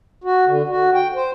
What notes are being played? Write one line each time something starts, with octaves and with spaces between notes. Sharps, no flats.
F#4
D3
F#4
G5
C5